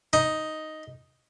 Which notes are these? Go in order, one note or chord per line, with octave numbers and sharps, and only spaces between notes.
D#4